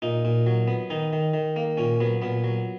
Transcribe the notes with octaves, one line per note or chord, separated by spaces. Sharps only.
A#2 D#4
A#2
F#3
B3
D#3 D#4
D#3
D#3
A#3
A#2 C#4
F#3 B3
A#2 B3
F#3